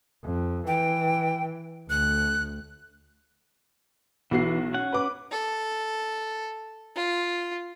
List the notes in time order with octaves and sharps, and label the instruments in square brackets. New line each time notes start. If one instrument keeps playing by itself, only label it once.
[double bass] F2
[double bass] E3 [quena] G5
[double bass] D2 [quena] F#6
[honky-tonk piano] B1 F#4 C7 [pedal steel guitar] E3
[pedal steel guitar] C#4 F#5
[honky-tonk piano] B4 D6
[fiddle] A4
F4